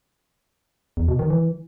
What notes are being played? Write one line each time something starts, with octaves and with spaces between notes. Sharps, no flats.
E2
B2
D#3
E3